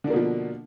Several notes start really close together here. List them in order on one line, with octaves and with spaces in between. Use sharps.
D3 D4 A#3 B2 F3